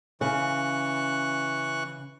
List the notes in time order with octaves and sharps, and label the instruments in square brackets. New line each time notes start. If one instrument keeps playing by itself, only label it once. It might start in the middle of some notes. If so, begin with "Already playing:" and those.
[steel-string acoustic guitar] C#3 [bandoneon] E3 C#6 F#6